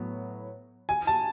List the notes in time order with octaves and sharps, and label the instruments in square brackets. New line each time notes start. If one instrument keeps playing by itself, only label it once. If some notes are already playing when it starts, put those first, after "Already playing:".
Already playing: [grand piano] A2 F#3 B3
[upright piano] G#5
A5